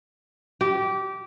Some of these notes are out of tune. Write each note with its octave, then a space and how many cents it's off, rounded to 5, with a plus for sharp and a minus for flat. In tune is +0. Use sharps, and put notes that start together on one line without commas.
G4 -20